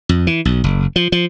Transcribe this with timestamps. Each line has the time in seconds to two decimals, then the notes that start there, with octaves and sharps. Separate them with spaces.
0.09 F2
0.27 E3
0.45 B1
0.64 F#1
0.96 F3
1.12 F3